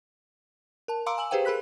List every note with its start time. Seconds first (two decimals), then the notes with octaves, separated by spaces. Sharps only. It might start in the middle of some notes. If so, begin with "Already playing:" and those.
0.88 A#4 A5
1.06 F5 A#5 C6 D6 E6 D7
1.18 G#5 E6 F#7
1.31 G4 G#4 B4 C5 F5 G5
1.45 G#4 A#4 B5 F#6 B6